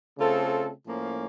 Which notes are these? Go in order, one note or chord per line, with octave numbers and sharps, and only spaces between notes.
C#3 A3 C4 F4 A4
A2 F3 A#3 C#4